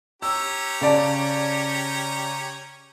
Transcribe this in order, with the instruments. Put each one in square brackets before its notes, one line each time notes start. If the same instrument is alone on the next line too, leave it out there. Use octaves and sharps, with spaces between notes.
[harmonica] C#4 G4 A#5 [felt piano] E6
[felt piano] C#3 D5 A5